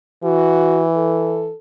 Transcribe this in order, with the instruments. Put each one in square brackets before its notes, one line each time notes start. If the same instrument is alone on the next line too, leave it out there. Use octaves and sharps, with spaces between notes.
[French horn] E3 [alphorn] F#4
[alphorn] A4